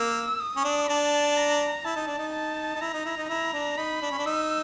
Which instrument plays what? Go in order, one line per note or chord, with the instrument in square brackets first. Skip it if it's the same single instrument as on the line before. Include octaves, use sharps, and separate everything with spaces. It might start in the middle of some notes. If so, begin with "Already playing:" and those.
Already playing: [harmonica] A#3 [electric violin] E6
[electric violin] D#6
[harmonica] C#4
D4
[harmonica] D4 [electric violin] A5
[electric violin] A#5
[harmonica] E4 [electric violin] A5
[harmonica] D#4
D4
D#4
[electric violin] A5
[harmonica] D#4
[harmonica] E4 [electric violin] A#5
[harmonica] D#4
E4
D#4
[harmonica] E4 [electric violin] A#5
[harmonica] D4
[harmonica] D#4 [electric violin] B5
[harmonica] D4
C#4
D4
[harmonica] D#4 [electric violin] E6